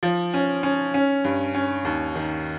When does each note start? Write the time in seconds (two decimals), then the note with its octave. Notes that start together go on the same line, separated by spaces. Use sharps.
0.03 F3
0.34 C#4
0.63 C#4
0.94 C#4
1.24 G2
1.55 C#4
1.85 D#2
2.15 D#3